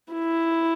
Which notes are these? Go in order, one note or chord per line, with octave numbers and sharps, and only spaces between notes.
E4